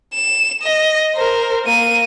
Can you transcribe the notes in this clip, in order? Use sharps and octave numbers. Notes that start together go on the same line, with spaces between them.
E7
D#5
A#4 C5
A#3 D#7